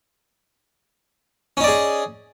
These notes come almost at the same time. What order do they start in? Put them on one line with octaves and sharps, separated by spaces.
C#4 D#4 D5 G#4